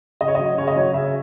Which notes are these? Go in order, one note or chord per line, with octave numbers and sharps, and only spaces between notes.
C#3 D#5
C#5
F#3 D#5
C#3 C#5
D#5
F#3 C#5
C#3 E5